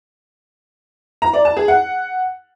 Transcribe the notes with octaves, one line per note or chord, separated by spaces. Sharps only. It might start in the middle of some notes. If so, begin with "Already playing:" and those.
A#5
D5
A5
G#4
F#5